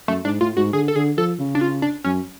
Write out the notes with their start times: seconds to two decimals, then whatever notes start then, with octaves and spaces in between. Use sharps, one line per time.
0.08 F#2 A3
0.25 G#2 D4
0.41 A2 F4
0.57 G#2 F#4
0.73 D3 G#4
0.88 A4
0.96 D3 G#4
1.17 F3 A4
1.39 C#3
1.55 D4
1.61 F4
1.82 D4
2.04 F#2 C#4